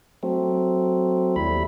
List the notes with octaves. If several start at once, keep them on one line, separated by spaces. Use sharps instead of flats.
F#3 A3 C4
D#2 G3 E4 B5